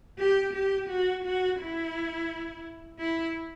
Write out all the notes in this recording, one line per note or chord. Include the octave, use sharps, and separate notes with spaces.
G4
G4
F#4
F#4
E4
E4